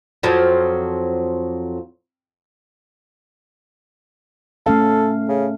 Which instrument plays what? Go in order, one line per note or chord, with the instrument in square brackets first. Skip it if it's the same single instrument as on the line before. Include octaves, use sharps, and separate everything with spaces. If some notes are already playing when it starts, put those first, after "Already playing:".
[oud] F2 F3 F#3
[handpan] A3 C#4 F5 [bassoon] A4
[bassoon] C#3